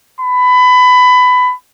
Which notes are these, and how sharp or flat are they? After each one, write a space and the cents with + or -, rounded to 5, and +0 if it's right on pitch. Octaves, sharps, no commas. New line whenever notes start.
B5 +20